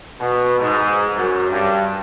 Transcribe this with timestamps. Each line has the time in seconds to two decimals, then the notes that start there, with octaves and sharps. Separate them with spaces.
0.21 B2
0.60 G#2
1.17 F#2
1.51 G2